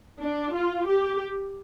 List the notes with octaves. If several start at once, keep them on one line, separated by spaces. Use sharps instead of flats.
D4
F4
G4